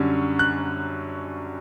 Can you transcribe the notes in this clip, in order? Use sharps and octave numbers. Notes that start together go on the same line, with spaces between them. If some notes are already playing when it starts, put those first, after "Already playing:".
Already playing: F#2 D3 G3 C#4
F#6